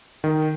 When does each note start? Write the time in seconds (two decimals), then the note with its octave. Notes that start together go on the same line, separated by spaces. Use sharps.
0.24 D#3